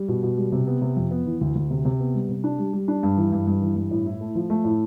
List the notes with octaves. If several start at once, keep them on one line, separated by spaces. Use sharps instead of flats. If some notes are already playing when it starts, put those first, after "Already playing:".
Already playing: G3
B2
B2
G3
C3
B3
C3
F2
B3
E3
D2
D2
C3
C3
B3
G3
C3
D4
G3
G3
D4
G2
E3
G2
G2
E3
G2
A2
E4
A3
F3
A3
A2